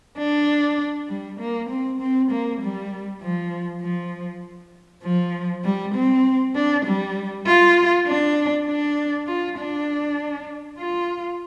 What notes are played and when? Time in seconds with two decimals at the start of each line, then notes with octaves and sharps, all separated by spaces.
0.18 D4
1.09 G3
1.40 A#3
1.69 C4
2.00 C4
2.31 A#3
2.61 G3
3.22 F3
3.81 F3
5.03 F3
5.64 G3
5.94 C4
6.55 D4
6.85 G3
7.46 F4
8.07 D4
8.67 D4
9.27 F4
9.58 D4
10.79 F4